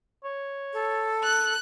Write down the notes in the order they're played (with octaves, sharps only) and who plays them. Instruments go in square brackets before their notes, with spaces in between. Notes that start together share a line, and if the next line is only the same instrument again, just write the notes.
[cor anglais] C#5
[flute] A4
[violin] F#6